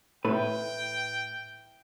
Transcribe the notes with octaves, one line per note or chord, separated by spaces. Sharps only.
A2 E4 B4 G5